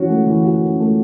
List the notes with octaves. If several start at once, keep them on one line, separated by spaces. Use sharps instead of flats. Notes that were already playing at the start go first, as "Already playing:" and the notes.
Already playing: E3 C#4 F#4
A3
E3
F#4
C#4
A3